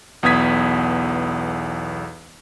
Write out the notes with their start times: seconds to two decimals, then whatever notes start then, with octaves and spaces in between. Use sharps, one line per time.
0.23 B1 E2 B3 D#6 G#6 B6